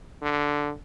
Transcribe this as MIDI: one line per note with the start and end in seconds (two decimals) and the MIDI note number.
0.22 0.73 50